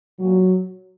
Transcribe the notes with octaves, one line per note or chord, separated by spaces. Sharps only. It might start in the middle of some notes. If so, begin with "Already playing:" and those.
A#2 F#3